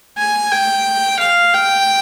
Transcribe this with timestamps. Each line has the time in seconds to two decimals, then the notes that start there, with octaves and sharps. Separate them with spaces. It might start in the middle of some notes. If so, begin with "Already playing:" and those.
0.18 G#5
0.52 G5
1.19 F5
1.54 G5